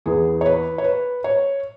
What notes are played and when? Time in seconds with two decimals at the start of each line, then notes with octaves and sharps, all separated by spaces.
0.06 E2 E3 B3 G#4
0.41 C#5
0.46 B4
0.78 C#5
0.84 B4
1.24 C#5